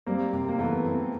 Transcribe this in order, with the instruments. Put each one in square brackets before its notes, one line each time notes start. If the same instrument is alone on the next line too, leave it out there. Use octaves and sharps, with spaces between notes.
[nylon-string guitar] G3 [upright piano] A#3 C4
[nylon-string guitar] C3
[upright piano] A#3
[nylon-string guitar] E3 [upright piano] A3 B3
[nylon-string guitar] C4
[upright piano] A3